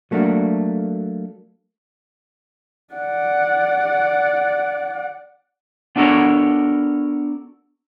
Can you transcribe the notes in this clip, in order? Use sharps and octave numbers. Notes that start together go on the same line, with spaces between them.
F#3 A3 A#3 D4 F#4
D5 F#5
B3 D4 F#4 A4 A#4 C#5